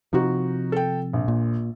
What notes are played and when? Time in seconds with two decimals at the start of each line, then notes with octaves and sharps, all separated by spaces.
0.13 C3 F3 D#4 F#4
0.72 A4 G5
1.13 A#1
1.28 A#2